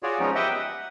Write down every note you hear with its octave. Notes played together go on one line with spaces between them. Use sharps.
F4 F#4 G#4 C#5 D5
F3 F#3 G#3 B3 C#4 D#4
G4 B4 D#5 E5 F#5 G5
F#5